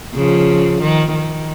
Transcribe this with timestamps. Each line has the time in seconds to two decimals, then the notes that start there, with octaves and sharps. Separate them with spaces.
0.15 C#3 F3
0.82 D#3
1.15 D#3